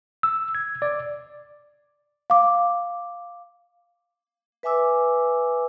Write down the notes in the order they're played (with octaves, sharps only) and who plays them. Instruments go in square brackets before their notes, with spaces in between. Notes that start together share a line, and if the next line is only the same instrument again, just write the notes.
[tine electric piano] E6
G#6
D5
[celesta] F5 D6
[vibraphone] B4 E5 G#5 D6 E6